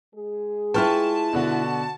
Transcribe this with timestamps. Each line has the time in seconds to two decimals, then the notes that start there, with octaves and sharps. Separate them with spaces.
0.15 G#3 G#4
0.74 E4 F4 B4 G5 A5 C#6 F6
1.33 B2 D3 F#4